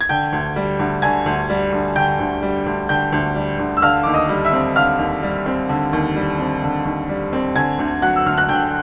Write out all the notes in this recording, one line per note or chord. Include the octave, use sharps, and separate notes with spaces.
G#6
D3 G5 G6
D2
G3
D2
D3 G#5 G#6
D2
G3
D2
D3 G5 G6
D2
G3
D2
D3 G5 G6
D2
G3
D2
E6
D3 F5 F6
D#2 D6
D#5 D#6
G3
E5 E6
C4
D3 F5 F6
D#2
G3
C4
D3
D#2
G3
C4
D3
D#2
G3
C4
D3 G#5 G#6
D2
F#3 F#5 F#6
E6
D2 F6
F#6
D3 G5 G6